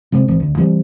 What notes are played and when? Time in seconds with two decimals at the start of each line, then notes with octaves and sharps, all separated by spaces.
0.12 C3 F#3 G#3 C4
0.28 G#1 E3 C4
0.40 D2
0.58 E3 G3 C4